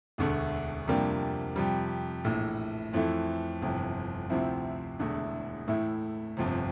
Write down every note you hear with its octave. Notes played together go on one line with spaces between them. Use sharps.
E1 D2 D3 A3
F2 C3 G3 A#3 D4
F2 C3 G3
A#1 A2 E3
F2 E3 A3 E4
G1 F2 C3 E3
D2 C3 F3 C4 E4
E1 E2 D3 A3 E4
A2 E3 A3 E4
G1 F2 C3